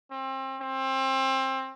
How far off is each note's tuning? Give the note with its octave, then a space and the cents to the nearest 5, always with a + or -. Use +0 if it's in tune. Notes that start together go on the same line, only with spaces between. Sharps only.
C4 +30
C4 +25